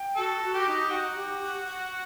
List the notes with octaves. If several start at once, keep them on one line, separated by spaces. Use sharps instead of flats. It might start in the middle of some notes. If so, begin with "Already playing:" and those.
Already playing: G5
F#4 A4
F#4
G4
D#4
F#4 F#5
G4
F#5
F#5